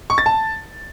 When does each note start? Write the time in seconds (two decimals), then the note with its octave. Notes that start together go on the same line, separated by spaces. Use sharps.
0.10 C#6
0.18 A6
0.26 A5